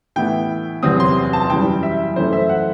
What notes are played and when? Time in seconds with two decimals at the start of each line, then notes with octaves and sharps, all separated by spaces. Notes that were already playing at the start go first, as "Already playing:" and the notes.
0.16 A2 E3 B3 E4 G5
0.83 E2 C3 F#3 C4 D#6
1.00 C6
1.33 A5
1.50 F#2 E3 G3 G5
1.83 E5
2.16 F#2 E3 A3 E4 C5
2.33 E5
2.49 F#5